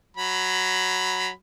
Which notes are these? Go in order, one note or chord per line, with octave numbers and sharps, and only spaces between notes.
F#3 B5